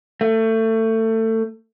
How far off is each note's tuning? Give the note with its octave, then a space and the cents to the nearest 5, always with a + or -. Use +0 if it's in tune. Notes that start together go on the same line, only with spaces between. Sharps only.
A3 +25